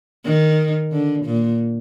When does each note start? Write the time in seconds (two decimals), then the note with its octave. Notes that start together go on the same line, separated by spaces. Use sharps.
0.24 D#3
0.92 D3
1.25 A#2